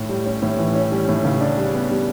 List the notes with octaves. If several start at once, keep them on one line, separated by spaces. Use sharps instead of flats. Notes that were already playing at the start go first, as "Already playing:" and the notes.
Already playing: A2
G3
C#4
A2
E3
C#4
G3
A2
C#3
D4
G3
B3
G3